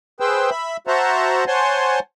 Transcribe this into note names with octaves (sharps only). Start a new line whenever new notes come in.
G#4 B4 C5 G5 E6
E5 B5
F#4 C5 E5 F#5 A5 A#5
C5 C#5 F#5 G#5 A5 C6